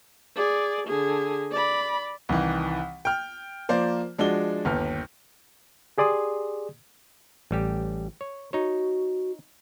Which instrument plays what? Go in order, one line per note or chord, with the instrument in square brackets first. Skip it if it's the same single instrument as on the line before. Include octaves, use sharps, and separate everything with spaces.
[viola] G#4 D5
D3 G#4
D5 B5
[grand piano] C2 D#3 E3
G5 F6
F3 A#3 C5 D5
F3 G#3 D4 F#4 G7
G1 D#2 F6
[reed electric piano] G4 G#4 D5 C6 D#6
[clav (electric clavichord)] A1 G3 G4
C#5
[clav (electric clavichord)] D#4 C#5 [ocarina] F#4